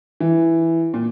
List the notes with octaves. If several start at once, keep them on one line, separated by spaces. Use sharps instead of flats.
E3
A#2